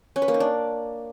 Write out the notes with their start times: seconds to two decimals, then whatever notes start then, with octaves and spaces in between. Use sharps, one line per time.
0.16 C#4
0.22 B4
0.28 A#3
0.34 D#4
0.40 D4